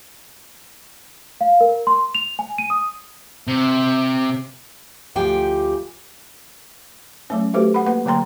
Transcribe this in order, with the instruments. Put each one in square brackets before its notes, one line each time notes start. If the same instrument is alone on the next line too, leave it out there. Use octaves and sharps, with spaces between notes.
[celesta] F5
A#4
C6
F7
G#5
D#7
D#6
[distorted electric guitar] C3
[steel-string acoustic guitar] D2 F3 G4 G5 G#5
[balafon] F#3 A3 C#4
A3 F#4 G4 A4 B4 C5
F#5 B5
A#3 B4 F#5
D3 F#3 A#3 G5 A#5 C6